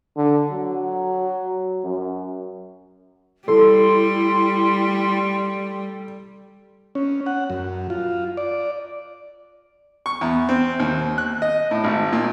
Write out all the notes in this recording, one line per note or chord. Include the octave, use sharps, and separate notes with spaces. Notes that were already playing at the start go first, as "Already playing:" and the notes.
D3
F#3
F#2
G3 E4 A4 C6
C#4
F#5
F#2
F4
D5
C#6
E2
C4
D#2
F#6
D#5
A2
G#1
A#2